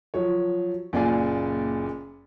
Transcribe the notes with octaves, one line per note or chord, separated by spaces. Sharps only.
F3 F#3 C#5
F#1 A#2 F4 D5 G#5